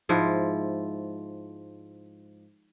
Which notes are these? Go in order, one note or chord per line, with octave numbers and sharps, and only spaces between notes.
G#2 F3 E4